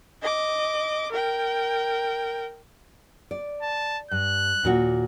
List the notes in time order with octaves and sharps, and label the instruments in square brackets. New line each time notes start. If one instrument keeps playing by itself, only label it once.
[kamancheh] D#5 D6
A#4 G5
[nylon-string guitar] D5
[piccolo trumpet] A5
[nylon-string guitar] G2 [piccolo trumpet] F#6
[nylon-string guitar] D#2 A#2 F#4